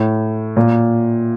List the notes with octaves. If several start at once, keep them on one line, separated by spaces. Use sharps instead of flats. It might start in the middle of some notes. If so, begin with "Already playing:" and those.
Already playing: A2
A#2